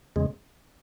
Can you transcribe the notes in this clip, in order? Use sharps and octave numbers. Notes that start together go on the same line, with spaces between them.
E2 C#3 G#3